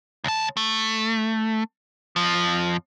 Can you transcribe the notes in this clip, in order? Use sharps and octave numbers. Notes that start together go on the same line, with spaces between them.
C#2 A5
A3
F2 F3